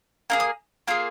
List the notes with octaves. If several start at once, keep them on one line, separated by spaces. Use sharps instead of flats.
A#3 D#4 G#4
D#6
A#3 F4 G#4